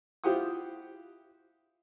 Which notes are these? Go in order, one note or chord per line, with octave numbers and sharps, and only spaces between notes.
E4 F4 G4 C5 F#5 D#6